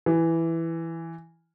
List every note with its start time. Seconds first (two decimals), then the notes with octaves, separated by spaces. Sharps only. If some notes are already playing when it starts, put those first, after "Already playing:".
0.06 E3